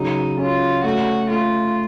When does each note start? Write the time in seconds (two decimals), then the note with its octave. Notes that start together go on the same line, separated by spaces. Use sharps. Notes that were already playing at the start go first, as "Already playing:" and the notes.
Already playing: C#3 F#3 D#4
0.38 C#4 F4
0.84 A3 F#4
1.30 A3 F4